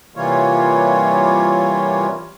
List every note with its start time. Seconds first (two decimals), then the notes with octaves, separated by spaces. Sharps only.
0.16 C3 E3 G3 A#3 F4 C#5